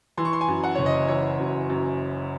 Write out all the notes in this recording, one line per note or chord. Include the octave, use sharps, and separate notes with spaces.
E3 C6
C#6
C6
G#5
F#2
F#5
F#1 C#5
D#5
E3 C#5
F#2
F#2